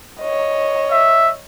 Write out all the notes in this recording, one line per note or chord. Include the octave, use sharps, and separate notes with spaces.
C#5 D#5
E5